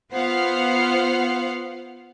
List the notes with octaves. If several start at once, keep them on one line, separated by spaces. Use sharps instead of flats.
B3 F4 C5 F5 F#5